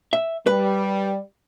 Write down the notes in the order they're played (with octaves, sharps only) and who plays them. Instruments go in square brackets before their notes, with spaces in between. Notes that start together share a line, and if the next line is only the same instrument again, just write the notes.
[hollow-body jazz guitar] E5
[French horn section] G3 [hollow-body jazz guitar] B4